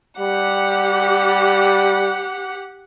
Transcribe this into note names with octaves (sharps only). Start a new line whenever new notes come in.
G3 G4 F#5